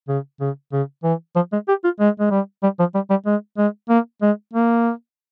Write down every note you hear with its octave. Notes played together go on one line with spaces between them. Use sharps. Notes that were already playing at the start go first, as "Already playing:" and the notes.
C#3
C#3
C#3
E3
F3
G#3
G4
F4
G#3
G#3
G3
G3
F3
G3
G3
G#3
G#3
A#3
G#3
A#3